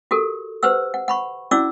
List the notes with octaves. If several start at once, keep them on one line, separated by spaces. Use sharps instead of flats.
F#4 G4 A4 A#4
G4 B4 C5 F#5 E6
F#5
F#5 B5 C#6
C#4 E4 F#4 D5 D6 E6